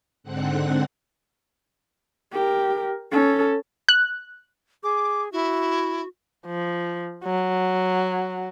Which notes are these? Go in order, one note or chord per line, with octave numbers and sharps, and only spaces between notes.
G#2 D3 C4 F#5 F#6
G4 A#4
C#4 A4
F#6
G#4 D6
E4 F#4
F3
F#3